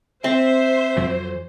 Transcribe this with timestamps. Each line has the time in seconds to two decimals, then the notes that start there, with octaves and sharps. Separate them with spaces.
0.24 C4 C5 E5
0.97 F2 E3 F#3